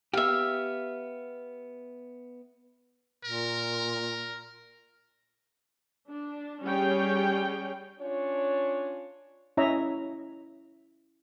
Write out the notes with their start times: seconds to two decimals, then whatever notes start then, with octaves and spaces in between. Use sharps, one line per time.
0.13 B3 G4 E5 F5
3.25 A#2 A#4
6.10 D4
6.64 G3 C#4 G#4 C#5 G5
8.00 C#4 D4 F4 C#5
9.57 C#4 E4 C#5 D#5 E5 A#5